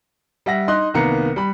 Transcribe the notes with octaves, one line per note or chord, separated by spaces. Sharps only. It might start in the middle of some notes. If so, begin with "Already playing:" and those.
G3 E5 F#5 A#6
D#4 D#5 C6 F#6
C2 D#3 A#3 B3 A#5 C#7
G3 B5